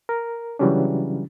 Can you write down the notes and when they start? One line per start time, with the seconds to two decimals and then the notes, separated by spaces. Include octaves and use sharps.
0.09 A#4
0.59 C#3 E3 F#3 G3 C#4 D4